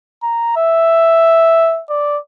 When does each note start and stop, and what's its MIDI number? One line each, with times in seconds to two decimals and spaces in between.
0.23 0.53 82
0.57 1.81 76
1.89 2.18 74